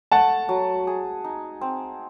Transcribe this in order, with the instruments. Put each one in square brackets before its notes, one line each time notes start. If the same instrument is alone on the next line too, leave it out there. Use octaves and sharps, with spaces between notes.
[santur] A3 [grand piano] F#5 A5
[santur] F#3
G#4
D#4
C4